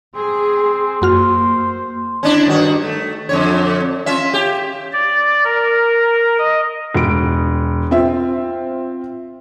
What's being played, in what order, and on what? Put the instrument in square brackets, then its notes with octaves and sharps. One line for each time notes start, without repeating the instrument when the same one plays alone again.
[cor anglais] C4 [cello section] G#4
[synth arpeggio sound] F#2 F#4 F6 [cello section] A#3 [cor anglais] C5
[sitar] C#4 D4 E4
G2 D#3 F#4
A3
F2 D3 C#5
C#4 F4 E5
G4
[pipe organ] D5
A#4
D#5
[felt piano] E1 D7
C4 F4 E5